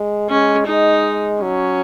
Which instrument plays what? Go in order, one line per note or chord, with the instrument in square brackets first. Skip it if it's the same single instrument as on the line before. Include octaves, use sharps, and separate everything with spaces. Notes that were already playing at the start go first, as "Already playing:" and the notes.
Already playing: [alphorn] G#3
[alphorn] G#3 [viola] C#4
[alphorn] G#3 [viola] D#4
[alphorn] F#3 [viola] C#4